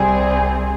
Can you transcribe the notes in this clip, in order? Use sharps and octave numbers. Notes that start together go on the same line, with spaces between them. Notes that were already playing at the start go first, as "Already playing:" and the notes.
Already playing: C2 C3 G3 C4 G#4